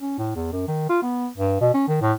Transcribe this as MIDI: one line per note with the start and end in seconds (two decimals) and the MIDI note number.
0.01 0.15 61
0.18 0.35 45
0.36 0.49 40
0.52 0.67 42
0.68 0.85 51
0.89 1.01 65
1.03 1.27 59
1.38 1.56 43
1.61 1.73 47
1.74 1.87 61
1.88 2.00 51
2.01 2.13 45